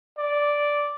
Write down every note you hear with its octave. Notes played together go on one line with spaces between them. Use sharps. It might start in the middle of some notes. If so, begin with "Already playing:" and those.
D5